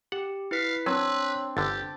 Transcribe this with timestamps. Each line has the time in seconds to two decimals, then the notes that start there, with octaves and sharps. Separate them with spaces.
0.12 G4 F#5
0.51 E4 B4 F5 B6
0.86 F#3 C4 D4 B4 C#5
1.57 G1 D3 G4 A6